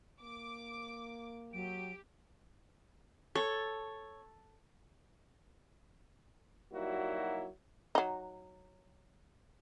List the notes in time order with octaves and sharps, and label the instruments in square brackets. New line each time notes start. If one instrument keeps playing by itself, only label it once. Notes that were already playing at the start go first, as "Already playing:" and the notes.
[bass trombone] A#3 [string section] D6
[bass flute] F#3 [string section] G4 [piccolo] D7
[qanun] A4 [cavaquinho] C#5
[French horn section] F#3 G3 A#3 D#4 E4 F#4
[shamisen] F#3 D#4